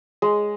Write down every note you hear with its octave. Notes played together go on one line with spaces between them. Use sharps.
G#3